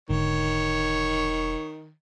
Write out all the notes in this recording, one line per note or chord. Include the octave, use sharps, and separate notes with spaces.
E1 G#2 D3 D#3 C#5